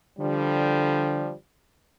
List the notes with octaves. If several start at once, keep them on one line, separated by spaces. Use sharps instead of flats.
D3 F3 G3